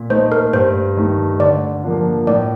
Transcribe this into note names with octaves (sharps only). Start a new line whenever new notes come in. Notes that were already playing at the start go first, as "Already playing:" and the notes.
Already playing: A#2
A3 D#4 C5
A#4
G2 C5
D#3 A3 D#4
D3 D5
F3 A#3 D4 F4
A2 D5